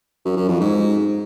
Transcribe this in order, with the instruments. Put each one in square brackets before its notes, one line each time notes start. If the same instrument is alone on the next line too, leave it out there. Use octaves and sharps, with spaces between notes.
[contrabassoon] F#2
F#2
F2
G#2